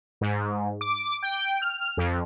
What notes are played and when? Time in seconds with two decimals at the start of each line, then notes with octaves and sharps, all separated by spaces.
0.21 G#2
0.81 D6
1.23 G5
1.62 F6
1.97 F2